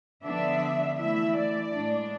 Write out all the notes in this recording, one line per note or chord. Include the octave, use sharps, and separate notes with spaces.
D3 F3 B3 D4 E5
E3 A3 E4 E5
D5
A2 G#3 D4